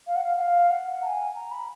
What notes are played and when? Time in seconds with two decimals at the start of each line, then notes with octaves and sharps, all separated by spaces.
0.07 F5
0.16 F#5
0.24 F5
0.38 F#5
0.42 F5
0.71 F#5
1.02 A#5
1.06 G#5
1.35 A#5
1.51 B5